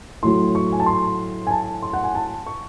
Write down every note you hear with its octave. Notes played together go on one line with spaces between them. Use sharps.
A2 F#3 A3 C6
C#6
G#5
A5
C6
G#5
A5
C6
F#5
G#5
A5
C#6